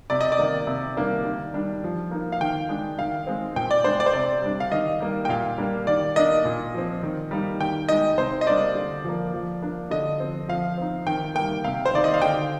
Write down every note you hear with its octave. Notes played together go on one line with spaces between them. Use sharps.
C3 D5
D#5
D5
D#3 A#3 D#4
C3
D#3 G3 A#3 D4
D#3
G3 D4
F3
A#3 D#4
F5
D#3 G5
G#3 D4
D#3 F5
G#3 C4
A#2 G5
D5
G#3 D4 C5
D5
C5
C3 D5
G3 D4
F5
D#3 D#5
G3 A#3
G5
A#2 F5
G3 A#3 D4
D#3 D5
A#3 D4 D#5
A#2
F3 C4
D#3
G3 A#3 D#4
D#3 G5
G#3 D#4 D#5
C3 C5
D#5
G3 A#3 D4 D5
D3
F3 A#3
F3
A#3 D4
D3 D#5
F3 C4
F3 F5
C4 D#4
D#3 G5
G3 A#3 G5
C3 F5
C5
D#3 A#3 D#4 D5
D#5
F5
D3 G5